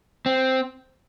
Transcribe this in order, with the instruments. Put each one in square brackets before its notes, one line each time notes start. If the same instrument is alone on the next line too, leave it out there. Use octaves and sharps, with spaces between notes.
[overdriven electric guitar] C4